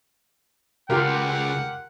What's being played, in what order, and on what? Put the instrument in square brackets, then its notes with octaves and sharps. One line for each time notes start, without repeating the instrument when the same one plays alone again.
[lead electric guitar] C#2 [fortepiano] F4 G4 A#4 [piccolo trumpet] F#5